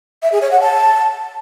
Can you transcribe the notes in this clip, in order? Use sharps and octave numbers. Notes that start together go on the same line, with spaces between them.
E5
G#4
C#5
F#5
A5